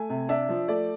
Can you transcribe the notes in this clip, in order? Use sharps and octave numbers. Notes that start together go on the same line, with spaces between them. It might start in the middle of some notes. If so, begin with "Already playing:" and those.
Already playing: A3 G#5
C3
D4 E5
F3
A3 D5